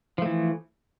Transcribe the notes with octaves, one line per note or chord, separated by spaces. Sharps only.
E3 F3 A3